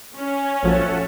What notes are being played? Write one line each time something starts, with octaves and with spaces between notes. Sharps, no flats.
C#4
A#1 F3 F#4 A4 E5